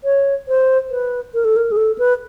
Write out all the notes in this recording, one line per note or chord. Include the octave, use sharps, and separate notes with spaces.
C#5
C5
B4
A#4
A4
A#4
G#4
A4
B4